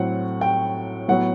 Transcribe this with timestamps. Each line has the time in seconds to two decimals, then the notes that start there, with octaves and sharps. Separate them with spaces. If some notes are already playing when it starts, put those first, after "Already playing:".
Already playing: A2 F#3 C4 F#5
0.41 G5
1.08 A2 F#3 B3 F#5